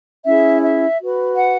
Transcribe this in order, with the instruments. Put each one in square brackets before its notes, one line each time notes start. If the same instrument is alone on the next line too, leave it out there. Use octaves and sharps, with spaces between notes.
[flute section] C#4 E4 G#4 E5
E5
F#4 B4
F#5